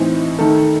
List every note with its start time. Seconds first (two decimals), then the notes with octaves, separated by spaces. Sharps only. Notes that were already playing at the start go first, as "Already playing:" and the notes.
Already playing: A2 E3 C4 D#4
0.39 D#3 A3 D#4 A4